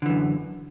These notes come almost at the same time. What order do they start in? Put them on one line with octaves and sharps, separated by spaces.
D3 E3 F#2